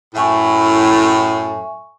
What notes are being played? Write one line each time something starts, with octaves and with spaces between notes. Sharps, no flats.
F#2 A2 E5 G#5 C#6